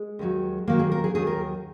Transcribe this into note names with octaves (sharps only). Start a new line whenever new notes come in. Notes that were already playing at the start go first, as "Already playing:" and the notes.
Already playing: G#3
D#2 D#3 F#3
D#2 D#3 F#3 A#3
G#4
A#4
G#4
D#2 D#3 F#3 G#4
A#4